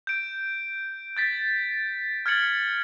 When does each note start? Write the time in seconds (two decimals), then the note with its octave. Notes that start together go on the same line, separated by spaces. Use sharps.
0.07 G6 D7
1.17 G6 A6 B6
2.26 F6 G#6 A6 C#7 F#7